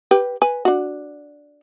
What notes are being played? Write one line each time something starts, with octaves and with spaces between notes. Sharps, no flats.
G4 B4 G5
B4 G#5
D4 F#4